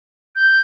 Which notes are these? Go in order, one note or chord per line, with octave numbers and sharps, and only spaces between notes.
G6